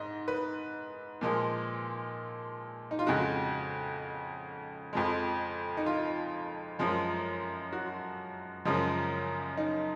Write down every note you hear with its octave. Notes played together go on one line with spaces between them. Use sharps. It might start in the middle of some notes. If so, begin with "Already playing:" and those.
Already playing: G#2 D#5
B4
A#2 F3 G#3
D#4
F4
F2 C#3 G#3 F#4
F2 F3 G#3
D#4
F4
F#2 F3 G#3
F#4
F#2 C#3 F3 G#3
D#4